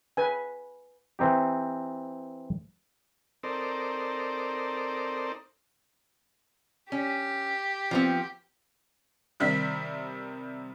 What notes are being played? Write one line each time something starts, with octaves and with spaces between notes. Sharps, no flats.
B4 G#5
E3 C4 D#4 G4
C4 D#4 A4 A#4 C5 D5
C#4 G4
F3 B3 C4
C3 D#3 G3 C4 E5 B6